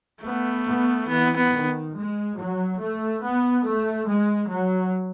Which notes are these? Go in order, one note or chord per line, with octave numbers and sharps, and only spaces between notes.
A3 B3
B3
E3 B3
B3
D#3
G#3
F#3
A3
B3
A3
G#3
F#3